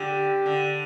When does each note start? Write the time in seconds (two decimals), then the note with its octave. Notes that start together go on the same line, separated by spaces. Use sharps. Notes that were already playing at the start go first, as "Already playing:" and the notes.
Already playing: D3 G4
0.46 D3